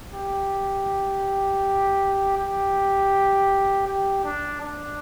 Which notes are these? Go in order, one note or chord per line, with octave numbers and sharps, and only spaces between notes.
G4
G4
G4
D4
D4